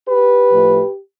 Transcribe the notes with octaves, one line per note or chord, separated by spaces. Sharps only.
G4 B4
A2 F3 A3